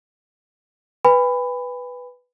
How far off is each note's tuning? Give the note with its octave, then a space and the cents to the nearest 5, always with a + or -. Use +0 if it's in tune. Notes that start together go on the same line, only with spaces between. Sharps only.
B4 +0 G#5 -40 B5 +15